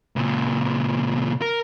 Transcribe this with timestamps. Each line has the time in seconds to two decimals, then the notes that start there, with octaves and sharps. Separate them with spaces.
0.16 C#2 A#2
1.42 A#4